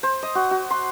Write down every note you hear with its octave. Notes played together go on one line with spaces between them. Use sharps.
C5
D#5
F#4
F#4
C6